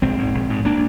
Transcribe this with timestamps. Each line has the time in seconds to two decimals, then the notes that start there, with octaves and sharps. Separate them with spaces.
0.02 A#1 G#3 C4
0.18 G#2
0.35 A#1
0.50 G#2
0.65 A#3 D4